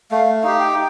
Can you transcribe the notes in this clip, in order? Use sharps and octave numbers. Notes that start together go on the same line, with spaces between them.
A3 F5
D#4 G4 F5
G5